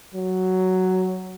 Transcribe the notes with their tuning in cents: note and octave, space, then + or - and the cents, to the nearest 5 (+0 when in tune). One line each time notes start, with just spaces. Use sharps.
F#3 +5